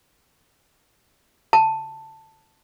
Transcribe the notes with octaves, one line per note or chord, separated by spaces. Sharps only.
A5